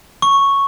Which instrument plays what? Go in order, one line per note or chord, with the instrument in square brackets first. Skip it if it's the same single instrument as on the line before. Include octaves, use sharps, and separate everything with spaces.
[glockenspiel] C#6